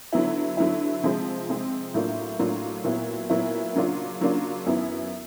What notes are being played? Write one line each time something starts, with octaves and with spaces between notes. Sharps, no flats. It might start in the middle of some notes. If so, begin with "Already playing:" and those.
D3 F#3 B3 E4
D3 F#3 B3 E4
C3 F3 G#3 C4
C3 F3 G#3 C4
A2 F#3 A#3 D4 F4
A2 F#3 A#3 D4 F4
A#2 F#3 B3 E4
A#2 F#3 B3 E4
C#3 F#3 A#3 D4 F4
C#3 F#3 A#3 D4 F4
F#2 D#3 F#3 B3 E4